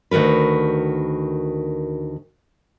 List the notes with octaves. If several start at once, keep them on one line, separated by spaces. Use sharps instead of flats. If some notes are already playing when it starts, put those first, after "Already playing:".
D2 D#3 F#4 A#4 B4